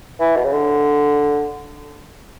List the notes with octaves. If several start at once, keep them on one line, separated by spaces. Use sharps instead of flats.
E3
B2
C#3
D3